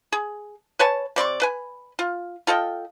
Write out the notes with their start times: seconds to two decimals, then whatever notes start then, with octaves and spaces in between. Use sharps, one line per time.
0.12 G#4
0.79 B4 C#5 G#5 A5
1.16 C3 D5 C6 C#6
1.42 B4 G#5
1.99 F4
2.47 F4 A4 D#5 G5